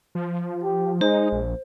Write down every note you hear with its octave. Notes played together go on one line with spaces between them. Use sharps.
F3
G4
G#3 D#4 C5
A#1